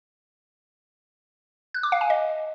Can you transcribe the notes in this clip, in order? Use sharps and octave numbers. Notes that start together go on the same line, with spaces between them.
F#6
D6
F5
G#5
D#5